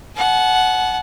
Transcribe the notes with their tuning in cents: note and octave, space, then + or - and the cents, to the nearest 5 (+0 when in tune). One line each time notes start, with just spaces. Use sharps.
F#5 +0 A5 -40